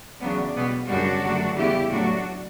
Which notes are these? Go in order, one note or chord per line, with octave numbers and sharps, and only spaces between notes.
E2 C#3 F#3 B3 D4
B2 G3 B3
F#2 C#3 G3 D4 F#4
F#2 D3 F#3 A3
E2 C#3 G3 B3 E4 G4
A2 F#3 A3 D4 F#4